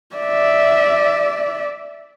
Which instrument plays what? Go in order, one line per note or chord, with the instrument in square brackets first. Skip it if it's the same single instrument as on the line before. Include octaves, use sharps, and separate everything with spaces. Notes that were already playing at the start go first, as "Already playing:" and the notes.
[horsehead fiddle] D5 E5